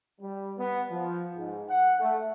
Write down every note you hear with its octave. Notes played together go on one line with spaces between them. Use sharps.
G3
B3
F3
G#2
F#5
A3